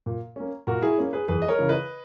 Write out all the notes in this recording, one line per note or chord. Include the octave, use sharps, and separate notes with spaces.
A#2
A#3 C#4
A#2 F#4 A#4
E4 G#4
A#3 C#4
G#4 B4
E2 G#4 B4
D#5
A#4 C#5
C#3 E3
B4 D#5